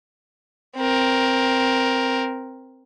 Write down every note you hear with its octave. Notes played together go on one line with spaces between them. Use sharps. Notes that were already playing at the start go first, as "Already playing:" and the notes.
C4 A#4